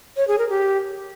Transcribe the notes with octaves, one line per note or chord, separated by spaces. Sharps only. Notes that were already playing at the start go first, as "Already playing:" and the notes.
C#5
G#4
A#4
G4